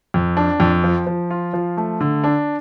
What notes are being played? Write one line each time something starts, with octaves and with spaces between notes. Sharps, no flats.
F2
D4
F2
F3
F3
F4
F3
A3
D3
D4